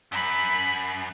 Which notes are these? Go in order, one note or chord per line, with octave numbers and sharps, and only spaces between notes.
F#2 B5